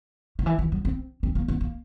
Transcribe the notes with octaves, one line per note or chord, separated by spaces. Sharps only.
D#3
E3
E3
F#3
C4
C4
A#3
B3
A#3